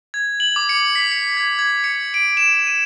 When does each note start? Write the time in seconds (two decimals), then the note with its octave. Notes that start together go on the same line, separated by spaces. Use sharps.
0.14 G#6
0.40 F#7
0.56 D6
0.69 C#7
0.95 B6
1.11 C#7
1.37 G#6
1.59 G#6
1.84 C#7
2.14 D7
2.37 E7
2.67 D#7